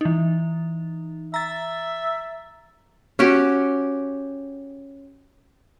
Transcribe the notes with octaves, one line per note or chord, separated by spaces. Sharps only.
E3 D#4
E5 A#5 A6
C#4 F#4 G4